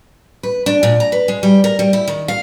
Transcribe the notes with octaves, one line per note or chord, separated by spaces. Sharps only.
B4
D4
A#2
A#5
B4
G#3
G3
A#4
G3
E4
D#3
F5